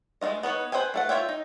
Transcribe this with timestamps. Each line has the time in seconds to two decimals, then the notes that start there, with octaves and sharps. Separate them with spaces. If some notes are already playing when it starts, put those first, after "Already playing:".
0.21 G#3 A3 D#4 F4 D#5
0.43 B3 D#4 B4 C#5
0.72 B4 C5 E5 G5 G#5
0.94 A3 A4 F#5
1.09 F4 C5 C#5 E5 G5
1.29 D#4